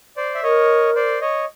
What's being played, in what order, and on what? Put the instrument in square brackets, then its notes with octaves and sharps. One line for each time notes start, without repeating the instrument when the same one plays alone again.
[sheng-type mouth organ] C5 D5
E5
[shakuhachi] A#4 [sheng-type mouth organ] C#5 D#5
[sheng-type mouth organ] C5 D5
C#5 D#5